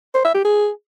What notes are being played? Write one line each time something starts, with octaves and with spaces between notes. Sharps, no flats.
C5
E5
G4
G#4